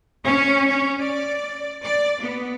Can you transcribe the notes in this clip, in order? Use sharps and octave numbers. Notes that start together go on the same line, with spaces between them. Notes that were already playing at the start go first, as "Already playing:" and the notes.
C#4
C#4
D5
D5
B3